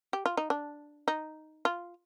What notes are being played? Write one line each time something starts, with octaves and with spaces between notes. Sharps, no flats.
G4
F4
D#4
D4
D#4
F4